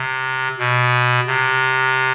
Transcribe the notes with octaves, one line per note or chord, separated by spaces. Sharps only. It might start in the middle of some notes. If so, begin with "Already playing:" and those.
Already playing: C3
B2
C3